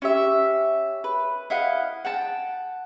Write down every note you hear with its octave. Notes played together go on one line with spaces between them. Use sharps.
C#4 G4 E5
B4
E4 D#5 F5 F#5
F#5 G5 A5